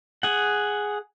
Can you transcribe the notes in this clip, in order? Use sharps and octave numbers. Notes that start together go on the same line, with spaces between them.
G#4 F#5